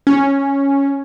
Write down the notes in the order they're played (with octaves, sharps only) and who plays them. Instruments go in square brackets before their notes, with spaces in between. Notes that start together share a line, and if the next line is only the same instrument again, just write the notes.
[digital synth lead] C#4